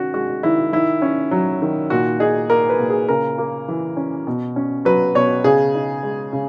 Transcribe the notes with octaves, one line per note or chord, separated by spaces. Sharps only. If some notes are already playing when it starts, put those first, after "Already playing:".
Already playing: D#3 C#4 F#4
G#3 F#4
D#3 E4
D#3 E4
C#4
F#3
D#3
A#2 F#4
D#4 G#4
A#3 A#4
B4
A#2
G#4
C#3 A#4
A#3
E3
C#4
B2
C#4
F#3 B4
B2 C#5
C#3 G#4
D#4
G#3
C#3